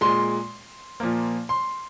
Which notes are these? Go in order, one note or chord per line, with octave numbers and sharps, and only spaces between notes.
A#2 G#3 C6
A#2 F3 A#3
C6